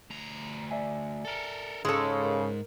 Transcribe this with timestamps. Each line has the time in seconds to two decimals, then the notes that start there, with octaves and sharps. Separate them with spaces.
0.11 D2 A#5
0.71 D5 E5 G#5
1.25 A4 A#4
1.85 G#2 C#3 G#3 A4 C6 C#6 G#6
2.23 A#4